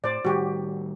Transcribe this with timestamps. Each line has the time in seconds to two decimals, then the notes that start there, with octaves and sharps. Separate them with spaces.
0.04 A2 C5 D5
0.25 A2 D#3 G3 F#4 G4